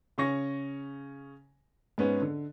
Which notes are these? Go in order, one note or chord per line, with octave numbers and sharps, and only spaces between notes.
C#3 C#4 C#6 A#6
G#2 B3 C#4
D3